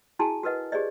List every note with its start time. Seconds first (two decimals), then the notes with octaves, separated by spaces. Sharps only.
0.19 E4 F#4 G#4 G#5 A5
0.43 F#4 A#4 B4 D#5 F#5
0.72 G4 G#4 C5 D5 D#5